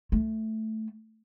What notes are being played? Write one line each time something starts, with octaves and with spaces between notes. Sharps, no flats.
A3